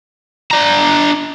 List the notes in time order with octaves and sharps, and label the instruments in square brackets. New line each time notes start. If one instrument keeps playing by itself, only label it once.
[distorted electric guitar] D4 A#5